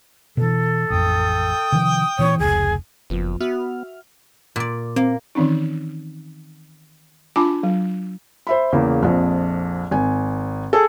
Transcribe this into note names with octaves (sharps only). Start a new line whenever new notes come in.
B2 E3 A4
A1 F2 G5 D#6
C3 D#3 F3
A#2 E3 C4 C#5
F1 C#2 G#4
F#1 F2 F3 B3
B3 F#4 E5 F6
A#2 D5
A#3 C4
D#3 E3 C4 C#4 D#4
D4 F4 G#5 A5 B5 D6
F#3
C5 E5 B5
E2 C#3 A#3
A#1 F2
G#1 G#5
G#4 A4